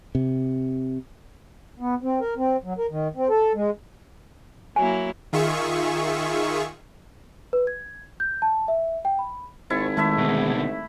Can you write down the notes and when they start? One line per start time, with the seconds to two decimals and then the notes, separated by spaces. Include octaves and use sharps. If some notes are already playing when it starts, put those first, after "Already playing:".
0.15 C3
1.80 B3
2.02 C4
2.21 A#4
2.37 C4
2.64 F#3
2.78 A#4
2.90 D#3
3.16 C4
3.30 A4
3.55 G#3
4.76 F#3 A#3 E4 G#5
5.33 D#3 F4 G#4 E5 C#6
7.53 B4
7.67 G#6
8.20 G6
8.42 A5
8.68 E5
9.05 G5
9.19 B5
9.70 G#1 E4 C5 A5 C#6
9.97 D#3 G#3 A3 E4 E5
10.18 B2 D3